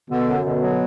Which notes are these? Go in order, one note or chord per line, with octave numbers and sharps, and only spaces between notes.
B2 D3
F#2
B2 D3
F#3